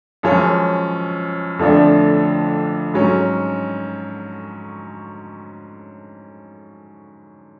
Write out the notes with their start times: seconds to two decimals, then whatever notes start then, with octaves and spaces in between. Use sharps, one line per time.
0.23 F#2 F3 G#3 C#4
1.59 F2 D3 F3 A3 D4
2.94 G#2 F#3 C#4